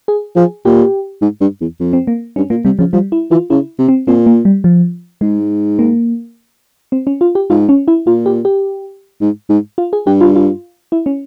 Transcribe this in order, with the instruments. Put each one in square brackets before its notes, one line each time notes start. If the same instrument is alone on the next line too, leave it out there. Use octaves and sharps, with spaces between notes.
[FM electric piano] G#4
[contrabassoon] F3 [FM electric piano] G#4
[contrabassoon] A#2 [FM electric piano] G4
[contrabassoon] G#2
G2
E2
F2
[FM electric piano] C4
A#3
[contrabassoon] G2 [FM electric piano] C#4
[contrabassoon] A#2 [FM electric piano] A#3
[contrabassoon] C3 [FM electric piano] G3
[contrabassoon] C#3 [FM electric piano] F3
[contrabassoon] F3 [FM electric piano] G3
[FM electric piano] E4
[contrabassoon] E3 [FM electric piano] F4
[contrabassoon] C#3 [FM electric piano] E4
[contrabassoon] C3
[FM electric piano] C4
[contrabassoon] A#2 [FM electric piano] C4
[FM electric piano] A#3
G3
F3
[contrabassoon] G#2 [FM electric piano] G#3
[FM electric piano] A#3
C4
C#4
F4
G4
[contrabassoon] G#2 [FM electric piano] F4
[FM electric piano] C#4
E4
[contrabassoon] A#2 [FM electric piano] F4
[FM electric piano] G4
G4
[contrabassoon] G#2
G#2
[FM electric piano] F4
G#4
[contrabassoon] G2 [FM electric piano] G4
[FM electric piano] F4
F4
E4
C#4